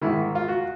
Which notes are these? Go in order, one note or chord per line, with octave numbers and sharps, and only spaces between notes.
G#2 D#3 E4
F4
F#4